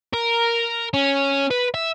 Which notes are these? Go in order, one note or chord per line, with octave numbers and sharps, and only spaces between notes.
A#4
C#4
B4
E5